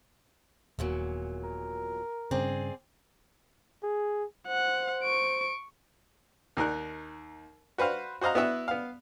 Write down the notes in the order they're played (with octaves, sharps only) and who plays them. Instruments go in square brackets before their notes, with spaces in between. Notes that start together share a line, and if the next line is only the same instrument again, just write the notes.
[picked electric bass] D#1 [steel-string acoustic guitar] E2 A#2 F#3
[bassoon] A#4
[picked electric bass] G2 C#3 [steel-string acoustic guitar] C4 G#4 D5
[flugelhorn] G#4
[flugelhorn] C5 [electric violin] F#5
[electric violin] C#6 D7
[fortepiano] D#2 D#4 A#4 F#6
F#4 B4 C5 F5
F#4 C5 D#5 F5 A#5
B3 E4 F#4 E5
B3 F5